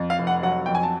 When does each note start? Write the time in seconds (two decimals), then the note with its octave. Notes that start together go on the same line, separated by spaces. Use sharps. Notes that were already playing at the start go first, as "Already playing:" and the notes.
Already playing: F2
0.10 F5
0.19 F1
0.27 F#5
0.43 F#3 F#5
0.66 F2 G5
0.75 G#5
0.83 A5